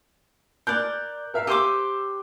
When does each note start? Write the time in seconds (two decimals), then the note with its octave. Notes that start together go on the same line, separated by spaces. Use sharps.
0.67 A#4 D5 F#6 G6
1.34 A#4 E5 F5
1.47 G4 C5 D6 E6 D#7